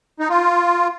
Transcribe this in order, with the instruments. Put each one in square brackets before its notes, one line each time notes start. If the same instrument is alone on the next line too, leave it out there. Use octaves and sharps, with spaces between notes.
[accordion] D#4
F4